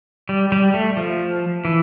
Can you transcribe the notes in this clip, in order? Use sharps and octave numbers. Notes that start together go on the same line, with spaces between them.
G3
G3
A3
F3
E3